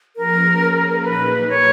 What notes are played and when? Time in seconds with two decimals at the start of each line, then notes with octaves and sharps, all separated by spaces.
0.16 F3 A#3 C#4 G#4 A#4 B4
1.04 A#2 F#3 A#3 D#4 G#4 B4
1.49 C#5